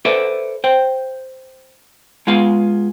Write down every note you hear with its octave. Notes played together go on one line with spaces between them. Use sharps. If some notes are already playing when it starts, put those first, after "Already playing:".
A4 B4 C5 D5 E5
C5 G5
G#3 B3 F4 G#4 F5